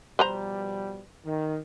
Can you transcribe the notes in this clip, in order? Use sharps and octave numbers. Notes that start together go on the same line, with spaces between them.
B2 F3 G3 B4 C5 A#5
D#3